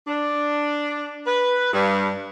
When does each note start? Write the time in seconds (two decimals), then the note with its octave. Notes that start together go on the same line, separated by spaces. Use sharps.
0.08 D4
1.27 B4
1.73 G2